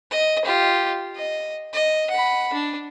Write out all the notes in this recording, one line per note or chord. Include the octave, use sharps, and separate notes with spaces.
D#5
F4 G4
D#5
D#5
F#5 B5
D4